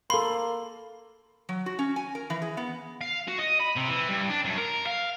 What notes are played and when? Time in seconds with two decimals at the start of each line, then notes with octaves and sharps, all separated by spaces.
0.10 A#3 A4 B5 C6
1.49 F#3
1.66 F#4
1.79 C#4
1.96 G#5
2.15 A#4
2.30 E3
2.42 G#4
2.57 B3
3.01 F5
3.28 F#4
3.39 D#5
3.61 B5
3.77 C3
3.89 E3
4.09 G2
4.30 D4
4.45 F#2
4.58 A#4
4.87 F5